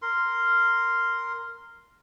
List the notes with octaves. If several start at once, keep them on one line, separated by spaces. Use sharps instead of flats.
A#4 C6